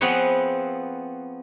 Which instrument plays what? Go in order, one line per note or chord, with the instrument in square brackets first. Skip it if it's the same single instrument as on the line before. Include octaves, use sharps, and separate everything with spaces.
[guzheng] F3 B3 C4 G#4 B4 C#5